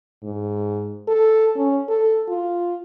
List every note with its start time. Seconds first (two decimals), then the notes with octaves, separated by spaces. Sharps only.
0.23 G#2
1.08 A4
1.56 C#4
1.89 A4
2.28 F4